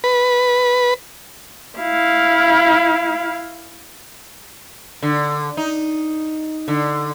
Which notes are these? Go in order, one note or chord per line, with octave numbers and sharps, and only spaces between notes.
B4
E4 F5
D3
D#4
D3